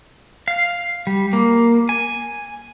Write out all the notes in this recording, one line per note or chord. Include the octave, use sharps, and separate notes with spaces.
F5
G3
A#3
G#5